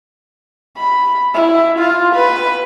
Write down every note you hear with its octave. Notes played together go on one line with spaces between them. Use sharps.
B5
E4
F4
B4